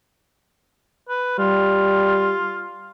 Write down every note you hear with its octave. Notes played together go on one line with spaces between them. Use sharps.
B4
G3 F4